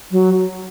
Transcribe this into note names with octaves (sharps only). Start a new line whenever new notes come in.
F#3